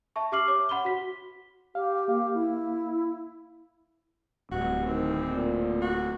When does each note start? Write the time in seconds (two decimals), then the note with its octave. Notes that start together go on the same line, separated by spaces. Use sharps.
0.16 E5 A5 C#6
0.32 G4 E5 D6 F6 C7 F#7
0.48 C#5 D6
0.69 F#5 B5 C6 G7
0.85 F#4 B6
1.75 G4 F5
2.08 A#3 G4 F5
2.34 E4
4.51 D1 G2 F#4
4.86 D#3 C4
5.31 A#2
5.81 F#4